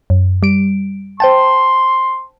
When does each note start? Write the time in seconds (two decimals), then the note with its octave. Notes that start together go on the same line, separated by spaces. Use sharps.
0.10 F#2
0.43 G3 D7
1.20 C5 G5 A5 C6